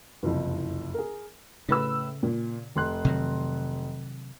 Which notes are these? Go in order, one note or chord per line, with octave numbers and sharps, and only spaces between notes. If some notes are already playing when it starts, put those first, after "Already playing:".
F#1 C2 F2
G#4 A#4
A2 C#3 B4 E6
A#2
F1 C6 F#6
C3 D#3 F#3